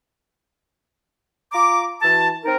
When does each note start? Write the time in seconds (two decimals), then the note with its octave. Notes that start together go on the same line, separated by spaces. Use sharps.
1.52 F4 A#5 D6
2.01 E3 F#4 A5
2.44 C4 D#4 A#4